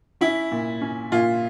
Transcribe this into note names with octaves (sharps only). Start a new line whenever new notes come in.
C#4 E4
A#2
C#4
A#2 F4